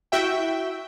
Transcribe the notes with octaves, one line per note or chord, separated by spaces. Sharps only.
E4 F#4 E5 G5